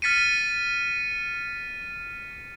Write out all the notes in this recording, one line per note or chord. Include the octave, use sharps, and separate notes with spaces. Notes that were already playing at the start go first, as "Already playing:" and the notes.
F6 A6 B6 C#7 D#7